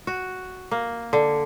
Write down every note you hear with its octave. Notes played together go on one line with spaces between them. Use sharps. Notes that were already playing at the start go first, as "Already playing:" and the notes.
F#4
A#3
D3